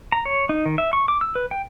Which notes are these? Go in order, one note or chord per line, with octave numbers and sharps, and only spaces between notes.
A#5
C#5
D#4
D#3
E5
C#6
D6
E6
B4
G5